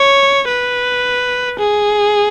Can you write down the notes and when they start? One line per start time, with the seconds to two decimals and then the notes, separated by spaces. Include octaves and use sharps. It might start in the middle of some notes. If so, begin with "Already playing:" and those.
Already playing: C#5
0.48 B4
1.59 G#4